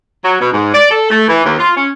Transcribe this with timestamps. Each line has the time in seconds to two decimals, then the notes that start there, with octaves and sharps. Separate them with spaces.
0.24 F#3
0.40 B2
0.53 G#2
0.74 D5
0.90 A4
1.10 A3
1.28 E3
1.44 D#2
1.58 F4
1.76 C#4